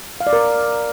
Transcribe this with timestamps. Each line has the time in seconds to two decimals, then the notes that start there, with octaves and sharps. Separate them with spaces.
0.20 F5
0.27 D5
0.33 A#4